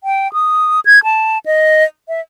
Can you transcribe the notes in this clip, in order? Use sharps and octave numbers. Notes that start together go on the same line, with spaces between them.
G5
D#6
G#6
A5
D#5
E5